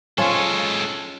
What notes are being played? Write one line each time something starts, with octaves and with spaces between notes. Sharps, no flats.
G#3 C#4 F4 A4